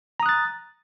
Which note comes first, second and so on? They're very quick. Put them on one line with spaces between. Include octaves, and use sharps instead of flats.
A#5 D#6 F#6 A6